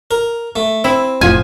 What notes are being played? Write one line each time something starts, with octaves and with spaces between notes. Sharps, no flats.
A#4
A3
C4 E4
E1 A2 F3 F4 G#5